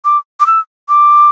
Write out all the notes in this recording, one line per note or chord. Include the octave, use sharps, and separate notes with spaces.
D6
D6
E6
D6